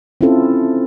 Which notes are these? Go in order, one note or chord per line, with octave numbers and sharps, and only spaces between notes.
C4 C#4 E4 F4 A4